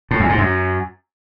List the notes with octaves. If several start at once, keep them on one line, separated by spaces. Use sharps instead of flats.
A2
E2
G#2
F#2